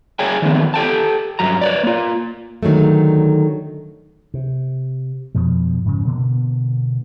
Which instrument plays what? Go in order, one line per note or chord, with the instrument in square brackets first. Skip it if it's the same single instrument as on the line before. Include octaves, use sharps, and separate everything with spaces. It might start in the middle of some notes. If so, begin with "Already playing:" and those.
[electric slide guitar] G#4 C#5 G5 G#5
D#3 E3 A3 B3 C4
G4 A4 G5 A5
G2 F#3 A#5
B4 C#5 D5
A#3 F4
[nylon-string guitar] D3 D#3 F#3 G#3 A3
[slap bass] C3
F2 B2 F3
G#2 C#3 F3
B2 D3 A#3 B3